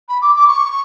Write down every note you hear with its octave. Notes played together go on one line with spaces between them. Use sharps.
B5
D6
D6
C#6